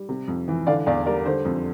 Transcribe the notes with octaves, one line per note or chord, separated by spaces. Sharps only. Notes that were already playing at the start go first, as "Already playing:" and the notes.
Already playing: G3
C3
F2
E3
D3 D5 F5
E2 D5 F5
G3 A#4 D5
D3 C5
F2